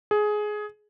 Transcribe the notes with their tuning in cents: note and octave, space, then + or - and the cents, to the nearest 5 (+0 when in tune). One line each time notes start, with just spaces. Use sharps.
G#4 +15